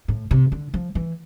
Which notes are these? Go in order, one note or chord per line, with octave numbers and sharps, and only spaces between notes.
A2
C3
D3
F3
E3